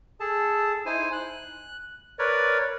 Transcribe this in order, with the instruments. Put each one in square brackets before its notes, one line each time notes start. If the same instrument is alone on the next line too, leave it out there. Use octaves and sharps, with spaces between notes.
[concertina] G#4 A4 A5
D#4 E4 C5 G#5
F#6
A#4 B4 C#5 D5